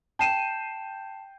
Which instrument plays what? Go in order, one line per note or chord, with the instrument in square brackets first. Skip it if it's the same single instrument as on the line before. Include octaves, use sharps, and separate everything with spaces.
[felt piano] G5 C7 D#7 [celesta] A5 E7